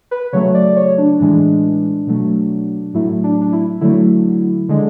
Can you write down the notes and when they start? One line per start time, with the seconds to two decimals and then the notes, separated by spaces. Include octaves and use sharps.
0.11 B4
0.33 C#3 F#3 A3 C#5
0.54 D5
0.76 C#5
0.98 D4
1.19 A2 E3 G#3 D4
2.07 B2 F#3 A3
2.94 A2 F#3 A3 E4
3.24 D4
3.41 D4
3.52 E4
3.81 D3 F#3 A3 E4
4.69 D3 G#3